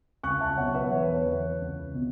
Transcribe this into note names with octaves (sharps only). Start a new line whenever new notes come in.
C#2 C#6 F#6
E5 A5
B2 F#3 C#5 F#5
B4 E5
E2 C#5
B4
C#5
E3
C#2
B2